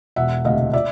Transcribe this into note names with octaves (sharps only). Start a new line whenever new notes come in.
E1 E5 F#5
D2 C3 D#5 F5
D5 E5